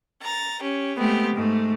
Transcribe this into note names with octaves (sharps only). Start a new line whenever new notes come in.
A#5 A6
C#4 G4
G#3 A3 B3 C4 G4
G#2 A3